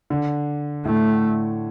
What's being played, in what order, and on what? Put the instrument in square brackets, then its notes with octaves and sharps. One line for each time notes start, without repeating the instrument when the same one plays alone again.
[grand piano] D3
[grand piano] A2 [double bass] A3